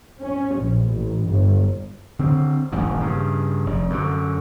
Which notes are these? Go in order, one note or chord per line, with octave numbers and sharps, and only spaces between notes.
C#4
A#1
A1
G1
D3 C4
D#1 A1 G2
G2 C#3
F1
F#2 D3